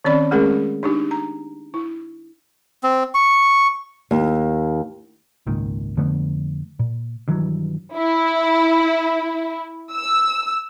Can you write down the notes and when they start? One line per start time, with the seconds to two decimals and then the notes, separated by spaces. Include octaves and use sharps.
0.04 D#3 C4 C#4 D5 B5
0.31 G#3 A3 C#4 G#4 A#4
0.83 D4 D#4 G4
1.11 A#5
1.74 E4
2.83 C4
3.14 C#6
4.11 D#2
5.47 G#1 C#2 A#2 D#3
5.97 F2 D3 A3 B3
6.79 A#2
7.28 G2 D#3 E3 F#3
7.97 E4
9.95 E6